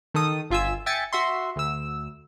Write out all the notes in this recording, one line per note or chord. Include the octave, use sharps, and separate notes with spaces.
D#3 A4 D#6
G1 F4 E5 G#5 E6
E5 G5 G#5 A6 C#7
F#4 E5 C6
D2 E6